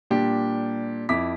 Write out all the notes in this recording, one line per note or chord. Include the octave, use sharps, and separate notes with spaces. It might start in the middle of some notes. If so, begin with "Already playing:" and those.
A#2 G3 D4 G4
F2 E4 D6 B6